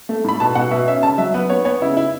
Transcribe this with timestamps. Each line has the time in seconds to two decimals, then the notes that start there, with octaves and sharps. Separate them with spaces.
0.09 A3
0.24 A2 B5
0.40 B2 A5
0.55 B2 F#5
0.71 B2 E5
0.87 C#4 E5
1.02 C#3 A5
1.18 F#3 E5
1.34 B3 B4
1.50 B3 C#5
1.65 B3 C#5
1.81 C#3 E4
1.97 E4